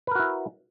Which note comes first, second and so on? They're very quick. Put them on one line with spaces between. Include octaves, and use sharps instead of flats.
B4 A#4 F#4 E4